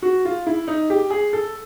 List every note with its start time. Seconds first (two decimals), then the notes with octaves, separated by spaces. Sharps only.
0.02 F#4
0.25 F4
0.46 E4
0.67 D#4
0.90 G4
1.10 G#4
1.33 A4